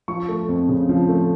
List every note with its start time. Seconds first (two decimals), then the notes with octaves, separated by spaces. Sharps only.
0.08 F3 C#6
0.29 A3
0.48 F2
0.69 C#3
0.89 F3
1.09 A3